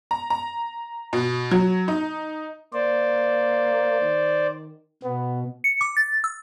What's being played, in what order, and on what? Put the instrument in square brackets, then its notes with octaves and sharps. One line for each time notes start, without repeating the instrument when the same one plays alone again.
[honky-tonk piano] A#5
A#5
B2
F#3
D#4
[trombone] A#3 [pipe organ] C5 D5
[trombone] D#3
[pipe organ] B2 [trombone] B3
[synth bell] C#7
D6
A6
E6